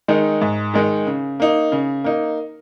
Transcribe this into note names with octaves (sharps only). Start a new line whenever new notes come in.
D#3 G#3 D#4
G#2
D#3 G#3 D#4
C#3
A#3 D#4
C#3
A#3 D#4